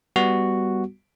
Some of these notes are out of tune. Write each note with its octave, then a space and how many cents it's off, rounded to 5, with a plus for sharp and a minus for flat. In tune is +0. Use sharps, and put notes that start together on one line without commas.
G3 +0 B3 +0 F#4 +0